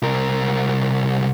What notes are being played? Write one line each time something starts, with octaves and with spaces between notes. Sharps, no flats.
C2 A#4